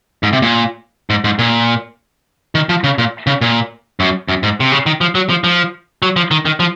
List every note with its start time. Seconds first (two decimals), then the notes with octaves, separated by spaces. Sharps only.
0.23 G#2
0.33 C3
0.42 A#2
1.10 G#2
1.24 G#2
1.39 A#2
2.55 D#3
2.69 F3
2.84 C#3
2.98 A#2
3.27 C#3
3.41 A#2
4.00 F#2
4.29 F#2
4.43 G#2
4.60 C3
4.72 C#3
4.86 D#3
5.01 F3
5.15 F#3
5.30 F3
5.44 F3
6.02 F#3
6.16 F3
6.31 D#3
6.45 D#3
6.60 F3